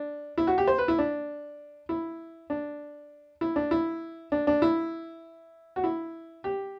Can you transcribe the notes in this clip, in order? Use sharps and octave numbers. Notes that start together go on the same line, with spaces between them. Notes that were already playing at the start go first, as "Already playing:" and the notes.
Already playing: D4
E4
F#4
G4
C5
B4
E4
D4
E4
D4
E4
D4
E4
D4
D4
E4
F#4
E4
G4